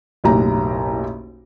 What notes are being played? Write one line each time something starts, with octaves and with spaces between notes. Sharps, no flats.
F#1 B1 A2 G4 A#5